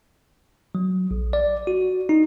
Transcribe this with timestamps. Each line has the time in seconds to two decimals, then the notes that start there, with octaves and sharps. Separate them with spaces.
0.75 F#3
1.11 A#1
1.33 D5
1.67 F#4
2.09 D#4